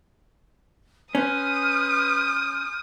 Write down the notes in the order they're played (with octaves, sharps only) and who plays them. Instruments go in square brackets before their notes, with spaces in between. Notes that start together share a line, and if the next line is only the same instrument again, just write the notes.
[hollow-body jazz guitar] C#4 [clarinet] B4 [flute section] C6 F6 G6 [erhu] D#6